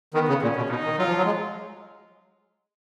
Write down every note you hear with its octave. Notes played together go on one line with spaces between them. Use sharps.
D#3 B3
C#3
A#2 C#4
B2
B2 D#4
D#3
F#3 F4
F3
F#3
G#3